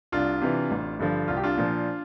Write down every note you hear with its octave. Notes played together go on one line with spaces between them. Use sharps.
C2 D4 F4
C3 E3
A1
G2 D3 F3
C2 F4
G4
D4 F4
A#2 F3